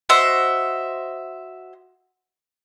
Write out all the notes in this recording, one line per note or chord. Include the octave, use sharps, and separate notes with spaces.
F#4 C5 D#5 E5